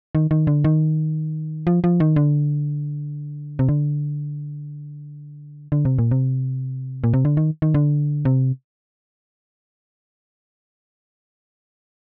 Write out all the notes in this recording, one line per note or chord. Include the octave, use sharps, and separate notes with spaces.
D#3
D#3
D3
D#3
F3
F3
D#3
D3
C3
D3
D3
C3
A#2
C3
A#2
C3
D3
D#3
D#3
D3
C3